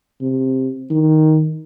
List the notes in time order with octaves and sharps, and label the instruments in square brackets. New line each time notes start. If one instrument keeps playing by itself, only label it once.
[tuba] C3
D#3